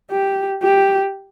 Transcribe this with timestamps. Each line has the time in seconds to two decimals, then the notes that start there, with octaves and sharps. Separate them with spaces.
0.11 G4
0.63 G4